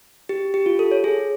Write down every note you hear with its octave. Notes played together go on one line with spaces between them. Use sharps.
G4
G4
F4
A4
C#5
G#4